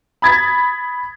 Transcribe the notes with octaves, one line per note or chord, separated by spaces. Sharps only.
B5 D#6 G#6 A6 B6